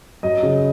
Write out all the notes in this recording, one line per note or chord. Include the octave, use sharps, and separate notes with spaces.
F#2 D#5
C#3